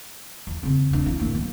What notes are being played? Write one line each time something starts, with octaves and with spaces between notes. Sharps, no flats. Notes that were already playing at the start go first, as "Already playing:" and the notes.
E2
C#3 C4
E2 D4
E3
G#1 A#3
F#3 B3